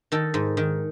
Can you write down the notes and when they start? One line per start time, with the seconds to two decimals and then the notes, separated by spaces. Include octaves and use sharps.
0.12 D#3 A4
0.34 G#2
0.57 D#3